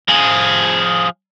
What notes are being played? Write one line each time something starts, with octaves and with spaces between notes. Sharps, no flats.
F3 G#4